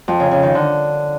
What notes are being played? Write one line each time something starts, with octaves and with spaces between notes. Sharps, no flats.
F2
C#3
C#3
D#3
D3